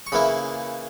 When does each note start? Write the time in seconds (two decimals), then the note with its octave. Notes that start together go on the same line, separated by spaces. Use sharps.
0.07 C#6
0.12 C#3 E3 A#3 E4 B5